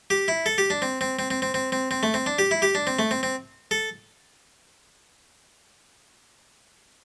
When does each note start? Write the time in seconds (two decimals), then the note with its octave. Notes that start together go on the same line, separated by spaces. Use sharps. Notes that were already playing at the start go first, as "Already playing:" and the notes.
0.10 G4
0.28 E4
0.46 A4
0.58 G4
0.70 D4
0.82 C4
1.01 C4
1.19 C4
1.31 C4
1.42 C4
1.54 C4
1.72 C4
1.91 C4
2.03 A3
2.14 C4
2.26 D4
2.39 G4
2.51 E4
2.62 G4
2.75 D4
2.87 C4
2.99 A3
3.11 C4
3.23 C4
3.71 A4